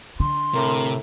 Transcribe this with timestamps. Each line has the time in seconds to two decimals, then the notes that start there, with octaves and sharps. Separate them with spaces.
0.20 D3 C6
0.54 A2 C3 A#4